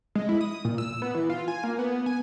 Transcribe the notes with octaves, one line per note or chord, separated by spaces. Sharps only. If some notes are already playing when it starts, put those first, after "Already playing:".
G#3
E4
D#6
A#2
E6
B3
E3
F4
G#5
A#3
B3
G#5